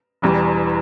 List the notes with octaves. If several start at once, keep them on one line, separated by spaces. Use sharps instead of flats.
E1 E2 E3 G3